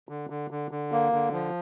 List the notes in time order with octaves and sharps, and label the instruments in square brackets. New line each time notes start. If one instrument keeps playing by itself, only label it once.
[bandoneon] D3
D3
D3
D3
A#3
D3
F3